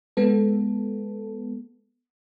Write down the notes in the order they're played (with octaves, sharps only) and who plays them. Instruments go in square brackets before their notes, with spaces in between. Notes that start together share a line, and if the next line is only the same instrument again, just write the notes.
[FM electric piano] G#3 B3 A4